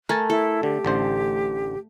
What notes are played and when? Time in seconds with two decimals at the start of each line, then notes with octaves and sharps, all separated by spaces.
0.09 A3 A#4 G#5 A5
0.30 E4 A4
0.63 D3 G4
0.85 A1 D3 C5